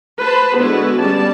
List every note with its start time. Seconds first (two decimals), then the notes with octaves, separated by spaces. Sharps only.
0.21 B4 C5 A5 B5
0.57 D3 G#3 B3 E4 F#4 B4
1.01 G3 B3 C#4 D5 A5